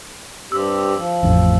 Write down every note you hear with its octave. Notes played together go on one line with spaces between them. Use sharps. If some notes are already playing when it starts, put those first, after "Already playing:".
G2 C4 G4 E6
F3
A1 F2